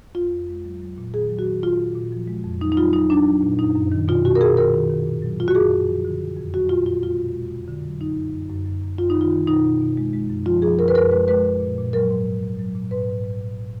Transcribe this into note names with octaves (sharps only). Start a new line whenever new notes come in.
F2 F4
F2
G#3
F#3
F#3
A#2
D#3 G#4
F#3
F#4
D#3
A#2 F4
A#2
A#2
F3
G#3
F2
F#3 D#4
D#4
F#3 F4
F#3 D#4
F#3 D4
F#3
A#2
F#2 D#4
F#2
D#3
B2 F4
B2 F#4
A#4
B2 G#4
D#3 A#4
D#3
D#3
A#2
F#3
A#2 F4
F#4
F#2 G#4
F#2
F3
D3
D3
F2
F#3 F#4
A#2 F4
A#2 F4
G#3 F4
B2
G#3
F2
D3
F#3
F#2 D#4
F#2
F#2
F#2
F#2
F#2
F#2 F4
D#4
D#3
F4
D#3
B2 D#4
B2
B2
G#3
G#3
F#2
F3 F4
F3 G#4
F#2 A#4
B4
F#2 A#4
G#3 B4
G#3 B4
G#3
A#2
A#2
F#3 A#4
G#2
G#2
F#3
F#3
A#2
G#2 B4
G#2
G#2
A#2
A#2